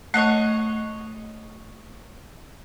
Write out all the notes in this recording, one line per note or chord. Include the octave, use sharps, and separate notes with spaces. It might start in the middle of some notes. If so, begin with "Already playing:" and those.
A3 C#5 D#5 F#5